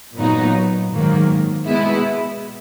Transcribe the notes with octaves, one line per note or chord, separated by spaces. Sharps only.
A#2 F#3 B3 D#4
G#2 D#3 F#3 A#3
B2 G#3 B3 E4